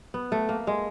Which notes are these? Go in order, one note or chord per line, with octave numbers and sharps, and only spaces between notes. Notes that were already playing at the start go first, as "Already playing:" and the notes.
B3
A3
A#3
G#3